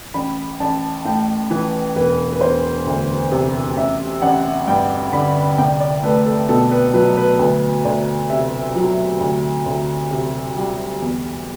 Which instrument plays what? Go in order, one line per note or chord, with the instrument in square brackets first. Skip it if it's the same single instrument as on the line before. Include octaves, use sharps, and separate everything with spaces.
[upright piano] A1 B5
A1 A5
A2 G5
E3 B4
E1 B4
B4
E1 C5
D2
C3
A1 E5
A1 F#5
G2 G5
D3 B5
C2 G5
D5
A3 B4
A4
B2 A4
B4
F#3 B4
B4
D2 B4
D2 D5
C3 E5
F#3
D2
D2
C3
G3
E2